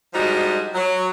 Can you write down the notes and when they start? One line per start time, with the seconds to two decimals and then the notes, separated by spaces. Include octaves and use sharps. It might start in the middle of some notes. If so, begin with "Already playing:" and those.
0.14 F3 G3 G#3 D4 D#4 F#4
0.75 F#3